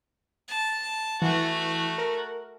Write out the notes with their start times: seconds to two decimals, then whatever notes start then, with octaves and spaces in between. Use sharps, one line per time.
0.48 A5
1.22 E3 A3 F#4
1.98 A#4